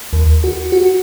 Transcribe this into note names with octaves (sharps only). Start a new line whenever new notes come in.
D#2
F#4
F#4